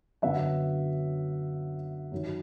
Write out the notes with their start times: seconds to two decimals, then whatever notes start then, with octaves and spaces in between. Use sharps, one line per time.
0.22 F#2 D3 F#3 B3 E5 F#5
2.12 F#2 D#3 F#3